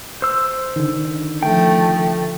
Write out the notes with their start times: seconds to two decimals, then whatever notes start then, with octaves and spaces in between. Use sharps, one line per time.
0.22 C5 E6
0.76 D3 D#3
1.43 F3 A3 G5